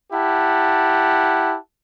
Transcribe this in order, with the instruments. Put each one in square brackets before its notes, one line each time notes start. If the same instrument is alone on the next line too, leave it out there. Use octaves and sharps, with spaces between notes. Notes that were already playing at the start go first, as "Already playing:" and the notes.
[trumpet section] E4 G4 F#5 A5